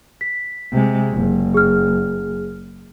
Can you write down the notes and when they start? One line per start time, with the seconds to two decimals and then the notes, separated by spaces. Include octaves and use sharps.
0.21 B6
0.72 C3 G#3
1.12 F#1
1.54 G#4 F6